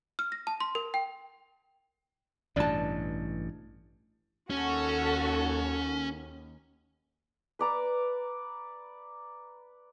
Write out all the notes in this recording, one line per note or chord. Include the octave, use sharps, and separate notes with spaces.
F6
A#6
A5
C6
A#4
G5
A1 G2 B2 D4 A5
D#2 C#4 F#4 A4
B4 D5 A#5